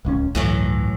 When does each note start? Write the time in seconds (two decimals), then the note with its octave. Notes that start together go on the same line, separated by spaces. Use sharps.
0.05 D1 C#2 C#4
0.35 G1 C#2 A2 E3 F#3 A3